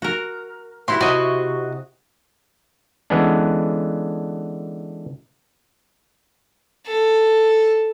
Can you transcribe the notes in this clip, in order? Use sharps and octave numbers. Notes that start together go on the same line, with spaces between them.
F#4 A#4
E4 F#4 G4 C6
C3 F#4 D#5
D3 E3 G#3 B3 C#4 D4
A4